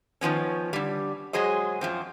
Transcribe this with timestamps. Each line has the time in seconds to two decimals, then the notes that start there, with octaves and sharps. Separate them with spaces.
0.21 D#3 F3 B3 C#4
0.73 D3 G3
1.33 F#3 G#3 G#4 C5 D#5
1.81 F#2 F3 C4